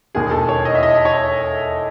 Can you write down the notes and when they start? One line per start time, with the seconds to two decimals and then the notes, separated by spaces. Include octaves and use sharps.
0.15 E1 D#2 D#3 G#4
0.31 A4
0.49 C#5
0.65 D#5
0.75 E5
0.83 D#5
1.05 C#5